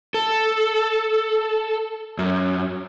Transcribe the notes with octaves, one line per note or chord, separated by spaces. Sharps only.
A4
F#2